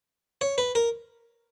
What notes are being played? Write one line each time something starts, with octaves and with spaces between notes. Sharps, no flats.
C#5
B4
A#4